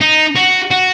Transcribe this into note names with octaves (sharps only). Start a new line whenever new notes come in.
D#4
F#4
F#4